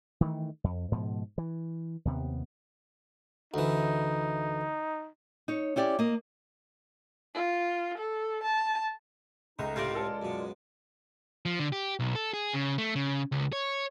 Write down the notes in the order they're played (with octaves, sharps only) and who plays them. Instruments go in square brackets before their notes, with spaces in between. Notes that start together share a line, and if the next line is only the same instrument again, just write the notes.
[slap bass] D#3 E3 A3
F2
G#2 B2 F3
E3
D#2 C3 B3
[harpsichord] D2 E3 [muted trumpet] D#4
[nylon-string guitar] D#4 C#5
C#4 E4 G4 D5
A#3 D#5
[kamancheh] F4
A4
A5
[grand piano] C#2 [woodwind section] A3 D#4 [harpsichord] G#4
[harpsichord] A2 C3 D4 [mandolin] F4 A#4 D5
[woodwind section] C#2 G#3 [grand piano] A4
[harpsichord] F#2 B2
[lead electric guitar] F3
D3
G4
B1
A4
G#4
C#3
A3
C#3
C#2
C#5